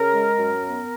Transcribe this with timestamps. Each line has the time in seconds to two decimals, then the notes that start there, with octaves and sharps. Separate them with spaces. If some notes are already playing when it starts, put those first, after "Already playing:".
Already playing: C#3 A#4
0.11 G#3
0.38 F#2
0.64 B3